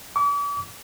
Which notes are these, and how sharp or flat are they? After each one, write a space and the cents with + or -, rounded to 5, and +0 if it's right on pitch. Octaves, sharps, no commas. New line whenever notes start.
D6 -45